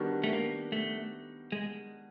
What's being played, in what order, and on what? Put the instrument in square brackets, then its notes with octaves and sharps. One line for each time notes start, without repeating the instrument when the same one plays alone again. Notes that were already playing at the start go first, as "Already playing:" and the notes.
Already playing: [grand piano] D#3 G3 B3 D4 F#4
[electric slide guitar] A3
A#3
A3
G#3